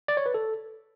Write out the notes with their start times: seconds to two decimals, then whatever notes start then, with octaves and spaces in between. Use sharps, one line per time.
0.08 D5
0.17 C#5
0.26 B4
0.34 A4